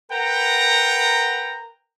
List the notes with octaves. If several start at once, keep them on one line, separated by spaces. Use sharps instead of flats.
A#4 B4 F#5 G5 A#5